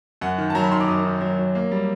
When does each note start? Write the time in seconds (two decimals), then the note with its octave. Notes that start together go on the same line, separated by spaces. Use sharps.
0.21 F#2 F#5
0.38 D#3
0.50 A5
0.55 F#3 A#5
0.64 B5
0.72 D#3 C6
0.80 D6
0.88 F#2 D#6
1.05 D#3
1.21 F#3
1.39 F#3
1.55 A#3
1.71 G3